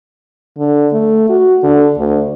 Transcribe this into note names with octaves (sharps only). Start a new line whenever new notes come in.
D3
A3
F#4
D3
D2